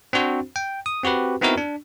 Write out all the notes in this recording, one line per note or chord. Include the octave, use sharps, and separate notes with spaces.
C4 D4 F#4 C5
G5
D#6
C4 F#4 G4 B4
B3 C4 D#4 E4 F#4 A#4
D4